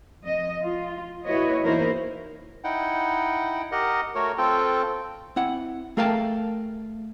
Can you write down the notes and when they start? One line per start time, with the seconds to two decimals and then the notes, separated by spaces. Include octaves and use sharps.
0.23 F2 D#5
0.62 F4
1.24 A#2 E4 F#4 B4 C#5 D#5
1.63 E2 A#3 D#4 E4 A#4 C5
2.64 D#4 E4 F#5 G5
3.72 G4 A#4 D#5 F#5
4.15 A3 F#4 A#4 C#5
4.38 C4 F4 A4 G5
5.36 C4 E4 F#5
5.97 A3 G#4 A#4 F5 G5 A5